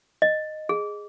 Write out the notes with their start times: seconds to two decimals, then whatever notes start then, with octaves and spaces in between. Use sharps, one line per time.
0.22 D#5
0.69 G#4